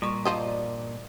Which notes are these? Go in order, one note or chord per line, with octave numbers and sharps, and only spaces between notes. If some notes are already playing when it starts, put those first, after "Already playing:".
A#2 G3 C#6
E2 G2 F3 D4 C5 D#5